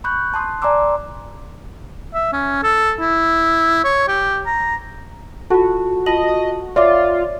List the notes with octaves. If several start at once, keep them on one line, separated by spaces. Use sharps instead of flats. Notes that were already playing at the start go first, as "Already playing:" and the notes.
B5 C#6 F#6 G6
A5 C6 D#6 F#6
D5 G#5 A#5 C6 D6 E6
E5
C#4
A4
E4
C#5
G4
A#5
F4 F#4 A4 A5
F4 D#5 A5 F#7
F4 C#5 D5 E5 D6